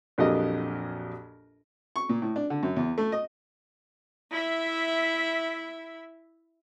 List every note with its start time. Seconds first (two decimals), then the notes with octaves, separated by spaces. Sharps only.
0.18 A#1 F2 F#3 G4 A#4 D#5
1.96 C#6
2.09 A#2
2.22 A2
2.36 D4
2.50 D3
2.63 F#2
2.76 E2
2.98 A3
3.12 D#5
4.31 E4 E5